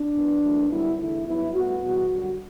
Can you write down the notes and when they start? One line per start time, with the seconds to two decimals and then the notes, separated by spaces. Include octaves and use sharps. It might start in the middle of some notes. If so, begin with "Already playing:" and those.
Already playing: D4
0.13 F#2 E3 B3
0.41 F#2 E3 A3
0.69 F#2 D3 G3 B3 E4
0.98 E2 D3 A3 E4
1.26 G2 F#3 B3 E4
1.54 A2 G3 B3 F#4
1.81 E2 B2 G3 B3
2.10 F#2 D3 G3